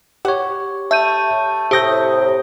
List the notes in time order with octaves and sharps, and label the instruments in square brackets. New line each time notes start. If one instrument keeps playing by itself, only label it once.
[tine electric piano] G4 C#5 [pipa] F#5
[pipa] A3 [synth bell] E5 G6 D#7
[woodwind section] A2 C3 [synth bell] G4 D#6 G6 [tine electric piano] E5 A#6